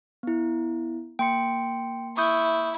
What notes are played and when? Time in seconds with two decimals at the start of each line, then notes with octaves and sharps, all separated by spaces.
0.23 B3 E4
1.19 A#3 G5 C6 C#7
2.17 E4 C#6 D#6 G6